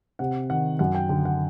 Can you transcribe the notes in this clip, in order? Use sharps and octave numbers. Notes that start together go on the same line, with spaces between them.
C3 F#5
D#3 F#5
F#2 F#5
G5
D3 G5
F#5